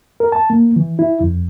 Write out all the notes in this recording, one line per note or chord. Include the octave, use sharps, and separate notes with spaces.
A#4
A5
A#3
E3
E4
F2